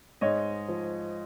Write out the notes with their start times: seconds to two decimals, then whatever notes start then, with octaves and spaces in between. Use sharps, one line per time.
0.21 G#2 C#5 D#5
0.68 F3